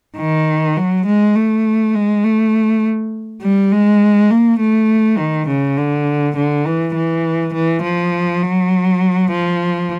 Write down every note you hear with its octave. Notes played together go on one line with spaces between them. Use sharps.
D#3
F#3
G#3
A3
G#3
A3
G3
G#3
A#3
A3
D#3
C#3
D3
D3
E3
E3
E3
F3
F#3
F3